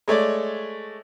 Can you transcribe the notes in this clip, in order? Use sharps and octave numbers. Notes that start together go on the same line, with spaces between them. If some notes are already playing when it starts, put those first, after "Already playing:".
G#3 A3 C#5 D5